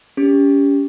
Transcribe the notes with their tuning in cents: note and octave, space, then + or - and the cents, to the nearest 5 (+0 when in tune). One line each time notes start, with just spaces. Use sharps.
C#4 +30 G4 +15